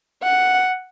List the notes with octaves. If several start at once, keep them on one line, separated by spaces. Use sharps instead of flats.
F#5